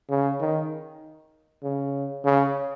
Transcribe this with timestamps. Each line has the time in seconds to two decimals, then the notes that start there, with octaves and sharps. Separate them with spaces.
0.10 C#3
0.40 D#3
1.64 C#3
2.25 C#3